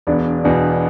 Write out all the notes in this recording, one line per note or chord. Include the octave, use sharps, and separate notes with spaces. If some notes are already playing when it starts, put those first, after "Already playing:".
E1 B3 D4
E2 B2 B3 D4